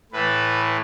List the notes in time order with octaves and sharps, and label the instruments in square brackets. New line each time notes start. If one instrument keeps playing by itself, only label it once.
[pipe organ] A2 E3 A3 B4